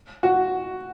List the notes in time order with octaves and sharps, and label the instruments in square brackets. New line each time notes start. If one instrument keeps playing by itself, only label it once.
[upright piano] F#4